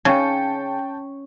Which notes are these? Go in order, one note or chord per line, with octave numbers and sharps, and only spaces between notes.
C#3 C#4 G5 A5 C#7